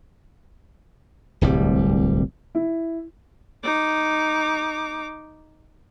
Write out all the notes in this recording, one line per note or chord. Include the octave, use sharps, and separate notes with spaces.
D1 C2 G3
E4
D#4 D6